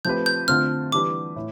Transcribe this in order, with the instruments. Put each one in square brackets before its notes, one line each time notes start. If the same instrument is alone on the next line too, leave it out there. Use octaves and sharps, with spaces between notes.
[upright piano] F3 A3 C4 G4 B4 [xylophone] G6
[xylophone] G6
[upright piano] D3 A3 C4 F4 [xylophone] F6
[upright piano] E3 G3 D4 G4 B4 [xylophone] D6
[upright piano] A2